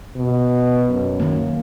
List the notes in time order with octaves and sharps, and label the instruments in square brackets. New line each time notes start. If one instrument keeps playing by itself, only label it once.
[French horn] B2
F#2
[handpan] D#3 A#3